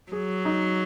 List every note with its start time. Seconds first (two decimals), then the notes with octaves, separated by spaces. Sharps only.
0.12 F#3 G#4
0.45 D#4